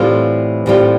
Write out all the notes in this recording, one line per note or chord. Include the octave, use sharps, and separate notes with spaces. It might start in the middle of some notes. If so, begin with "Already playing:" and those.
Already playing: A2 E3 G3 C4 F4
A2 E3 G3 C4 F4